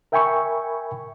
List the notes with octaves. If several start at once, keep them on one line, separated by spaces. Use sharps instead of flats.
A#4 E5 G5 G#5 B5 C#6